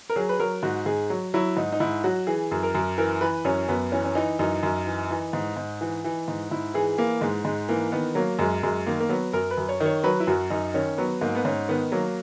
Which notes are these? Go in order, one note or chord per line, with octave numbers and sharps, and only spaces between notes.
A#4
F#3 G#4
B4
F#3 A#4
G#2 F#4
G#2 G#4
F#3
F#3 E4
G#2 D#4
D#4
G#2 E4
F#3 F#4
E3 G#4
F#2
A#4
F#2
E3 A#4
E3 B4
F#2 C#4
F#2 B3
E3 C#4
C#4
E3 D#4
F#2 D#4
F#2
E3
E3
G#2
G#2
E3
E3
G#2
G#2 E4
E3 G#4
E3 A#3
G#2 G#3
G#2 G#3
E3 A#3
D#3 B3
F#3 A#3
F#2 G#3
F#2 G#3
D#3 A#3
A#3
F#3 B3
F#2 A#4
B4
F#2
C#5
D#3
C#5
F#3 B4
E4
F#2 F#4
F#2 D#4
D#3 C#4
F#3 B3
G#2 A#3
B3
G#2 C#4
D#3 B3
F#3 A#3